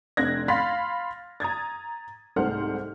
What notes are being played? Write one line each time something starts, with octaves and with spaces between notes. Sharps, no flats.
F1 C4 D4 F#6 G#6 A#6
F5 B5 C6 F6 A6 B6
A#5 D#6 G#6 A6
C2 G#2 A3 C5 F#5 F6